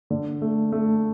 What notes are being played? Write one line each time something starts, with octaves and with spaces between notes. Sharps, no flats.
D3
A3
A3